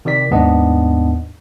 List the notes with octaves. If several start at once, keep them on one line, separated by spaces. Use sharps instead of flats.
C3 D#3 G4 D5 B6
D#2 G#2 B3 D4 D#5